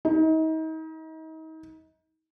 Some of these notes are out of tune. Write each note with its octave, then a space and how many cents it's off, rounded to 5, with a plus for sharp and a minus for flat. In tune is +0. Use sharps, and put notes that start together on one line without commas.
D#4 +35